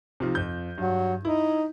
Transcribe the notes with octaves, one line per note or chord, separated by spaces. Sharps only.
C3 F3 D#4
F2 G6
G2 F#3
D#4 E4